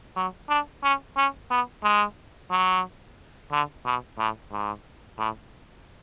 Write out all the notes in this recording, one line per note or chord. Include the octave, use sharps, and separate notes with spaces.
F#3
D4
C#4
C#4
B3
G#3
F#3
D3
B2
A2
G#2
A2